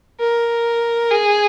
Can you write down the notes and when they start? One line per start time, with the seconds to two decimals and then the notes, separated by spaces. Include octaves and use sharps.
0.20 A#4
1.12 G#4